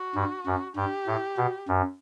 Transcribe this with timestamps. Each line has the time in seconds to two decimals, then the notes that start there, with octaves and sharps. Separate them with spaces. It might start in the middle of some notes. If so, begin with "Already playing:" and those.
Already playing: F#4
0.15 G2
0.46 F#2
0.76 G2 G4
1.07 A2
1.37 B2
1.68 F#2